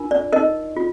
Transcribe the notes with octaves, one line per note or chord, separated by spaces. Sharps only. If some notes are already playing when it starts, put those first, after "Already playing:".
Already playing: D4 F4 A#4
D5
D#4 A#4 D#5
F4